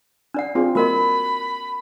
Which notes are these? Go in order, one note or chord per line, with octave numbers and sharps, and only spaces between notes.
D4 D5 F#5
C4 F4 G#4
G3 A#3 C4 F#4 A#4 D#5 B5